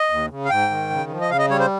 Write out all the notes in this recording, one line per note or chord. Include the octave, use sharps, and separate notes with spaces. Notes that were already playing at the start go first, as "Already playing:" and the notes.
Already playing: D#5
D#2
C#3
F5
G#2 G5
D#3
C#3
F3
D#5
C#3 F5
D#5
G3 C#5
C5